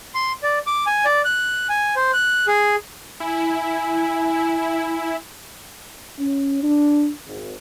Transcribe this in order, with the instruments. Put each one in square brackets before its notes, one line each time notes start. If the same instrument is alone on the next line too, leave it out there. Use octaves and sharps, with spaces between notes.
[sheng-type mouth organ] C6
D5
D6
G#5
D5
F#6
G#5
C5
F#6
G#4
[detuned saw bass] E4 [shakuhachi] G#5
[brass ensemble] C#4
D4
G#1